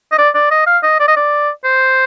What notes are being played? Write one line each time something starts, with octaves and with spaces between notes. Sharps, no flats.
D#5
D5
D5
D#5
F5
D#5
D5
D#5
D5
C5